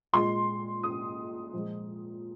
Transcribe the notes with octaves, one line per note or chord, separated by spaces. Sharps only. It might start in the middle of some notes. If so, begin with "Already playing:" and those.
A#2 G#3 C6
D#6
A#2 F3 G#3